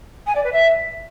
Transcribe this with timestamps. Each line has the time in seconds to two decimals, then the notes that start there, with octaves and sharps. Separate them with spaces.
0.26 G#5
0.35 D5
0.43 B4
0.52 E5